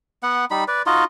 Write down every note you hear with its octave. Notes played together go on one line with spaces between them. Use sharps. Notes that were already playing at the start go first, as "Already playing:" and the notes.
B3 F#5
G3 D#4 B5
B4 D5
D#4 F4 F#4 D#5